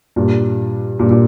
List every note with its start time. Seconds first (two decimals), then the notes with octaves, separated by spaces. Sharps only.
0.16 G2 A#2
0.99 G2 A#2
1.11 A#2